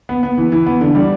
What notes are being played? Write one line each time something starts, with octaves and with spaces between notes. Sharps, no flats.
B3
B3
E3
E3
B3
D3
G3